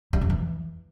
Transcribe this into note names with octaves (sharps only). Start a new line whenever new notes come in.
G3
F2
E3